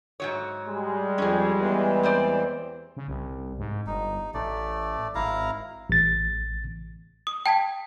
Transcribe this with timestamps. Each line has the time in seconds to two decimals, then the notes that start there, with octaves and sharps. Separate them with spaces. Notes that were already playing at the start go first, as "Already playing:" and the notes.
0.20 G#2 F#3 C#5
0.67 G3 G#3
1.18 F2 C#4 G#4
1.59 E2 E3
2.03 C4 C5 D5
2.97 C#3
3.08 C2
3.59 G#2
3.87 G1 D#4
4.34 A1 A3 D5
5.15 G#1 E4 F5 A#5
5.90 A1 A6
7.27 D#6
7.46 G5 A5 G#6 B6